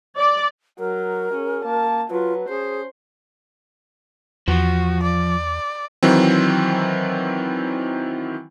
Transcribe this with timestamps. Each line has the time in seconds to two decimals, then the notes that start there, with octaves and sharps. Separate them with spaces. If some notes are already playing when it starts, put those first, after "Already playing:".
0.18 D5
0.79 F#3 A#4
1.34 C#4 G#4
1.65 A#3 A5
2.11 F#3 F4 B4
2.49 C#4 G#4 C5
4.48 E2 F3 F#4
5.03 D5
6.03 D#3 E3 F#3 C4